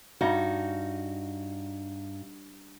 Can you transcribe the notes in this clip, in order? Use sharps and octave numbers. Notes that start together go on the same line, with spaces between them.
G2 D#4 F#4